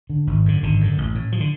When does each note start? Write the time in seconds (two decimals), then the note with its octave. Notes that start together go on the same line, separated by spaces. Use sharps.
0.10 D3
0.27 G#1
0.45 F#2 D3
0.63 G#1 D3
0.81 F#2 D3
0.98 A1
1.15 A2
1.32 F3
1.40 D3